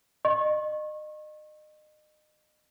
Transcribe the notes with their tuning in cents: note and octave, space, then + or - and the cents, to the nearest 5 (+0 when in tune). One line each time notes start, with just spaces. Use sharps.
D#5 -30 C#6 -35